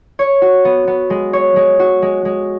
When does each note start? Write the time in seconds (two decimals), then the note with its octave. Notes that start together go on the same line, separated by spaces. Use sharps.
0.19 C#5
0.42 F#4
0.65 B3
0.87 B3
1.10 G#3
1.33 C#5
1.56 G#3
1.80 F#4
2.02 G#3
2.25 G#3